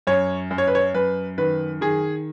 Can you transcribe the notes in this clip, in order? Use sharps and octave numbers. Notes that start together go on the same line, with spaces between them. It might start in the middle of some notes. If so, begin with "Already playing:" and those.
F#2 C#5
F#2
C#5
B4
C#5
F#2 B4
D#3 B4
D#3 G#4